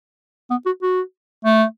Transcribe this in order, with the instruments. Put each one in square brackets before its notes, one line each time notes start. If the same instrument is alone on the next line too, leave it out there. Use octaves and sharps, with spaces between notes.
[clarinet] B3
F#4
F#4
A3